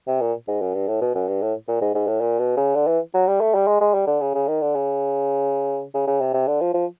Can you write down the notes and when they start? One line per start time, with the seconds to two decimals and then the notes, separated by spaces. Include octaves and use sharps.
0.07 C3
0.21 A#2
0.48 G#2
0.61 F#2
0.74 G2
0.88 A2
1.01 B2
1.15 F#2
1.28 G2
1.41 A2
1.68 A#2
1.81 G#2
1.95 G#2
2.07 A2
2.21 A#2
2.39 B2
2.57 C#3
2.75 D3
2.87 E3
3.14 F#3
3.27 G3
3.41 A3
3.55 G3
3.67 G#3
3.80 G#3
3.94 G3
4.07 D3
4.21 C#3
4.34 C#3
4.48 D#3
4.61 D3
4.75 C#3
5.94 C#3
6.07 C#3
6.21 C3
6.34 C3
6.47 D3
6.61 F3
6.74 F3